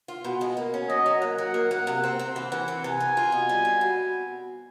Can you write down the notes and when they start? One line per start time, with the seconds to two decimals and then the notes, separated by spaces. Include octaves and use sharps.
0.08 F4
0.24 B2
0.41 G#3
0.57 A#3
0.74 C#4
0.90 F#3 D#5
1.06 F#3
1.22 A#3 F#5
1.38 F#3
1.54 A#3
1.71 A#3
1.87 C3
2.04 C4
2.19 C4
2.36 E3
2.51 E3 F#5
2.68 C4
2.84 C3 G#5
3.00 C3
3.17 F4
3.32 B2
3.49 G3
3.65 C4
3.81 B2